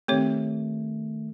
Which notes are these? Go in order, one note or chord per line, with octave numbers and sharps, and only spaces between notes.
D#3 A3 C4 G4 C#5